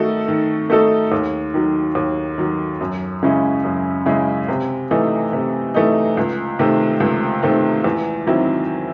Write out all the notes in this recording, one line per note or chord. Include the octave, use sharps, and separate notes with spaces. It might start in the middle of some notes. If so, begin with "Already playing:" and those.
Already playing: D#3 A3 D#4 F#4 A4
D#3
A3 D#4 F#4 A4
D#2
D#3 F#3
D#2
D#3 F#3
F#2
C#3 G#3 C#4 E4
F#2
C#3 G#3 C#4 E4
C3
E3 A3 D#4
C3
E3 A3 D#4
C#2
C3 D#3 A3 C4
C#2
C3 D#3 A3 C4
E2
D#3 F#3 C4 E4